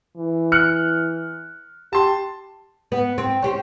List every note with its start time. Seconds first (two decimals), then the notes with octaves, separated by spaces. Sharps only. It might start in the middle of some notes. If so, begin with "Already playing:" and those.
0.17 E3
0.52 F6 F#6 C#7
1.93 G4 A5 C6
2.92 B3
3.18 C4
3.43 C#4 G4 C5